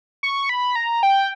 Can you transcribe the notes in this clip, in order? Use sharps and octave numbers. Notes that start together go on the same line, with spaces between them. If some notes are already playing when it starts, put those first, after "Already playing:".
C#6
B5
A#5
G5